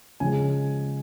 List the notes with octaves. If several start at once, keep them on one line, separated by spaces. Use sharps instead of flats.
C#3 F3 G#3 G#5